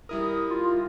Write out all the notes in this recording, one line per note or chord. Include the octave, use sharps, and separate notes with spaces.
G3 E4 A#4 D#6
F4